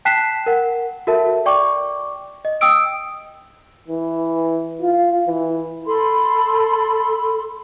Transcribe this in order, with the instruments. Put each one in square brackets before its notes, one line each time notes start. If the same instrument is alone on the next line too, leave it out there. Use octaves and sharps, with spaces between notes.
[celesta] G5 A5 F#6 B6 C7 E7
A#4 F#5
F#4 A4 A#4 E5 A5
D5 G5 C#6 D6
D#5
G5 D#6 E6 D7
[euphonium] E3
F4
E3
[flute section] A4 B5 C6